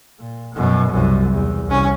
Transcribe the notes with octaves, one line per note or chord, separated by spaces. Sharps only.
A#2
F#2 B2
C2 F#2
E2
C2 C#4